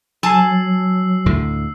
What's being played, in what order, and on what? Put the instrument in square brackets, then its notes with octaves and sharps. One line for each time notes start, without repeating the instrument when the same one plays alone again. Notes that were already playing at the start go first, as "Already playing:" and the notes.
[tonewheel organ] F#3 [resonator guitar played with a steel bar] G#5 A5 [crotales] E6 C7
[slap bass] D2 A2 D3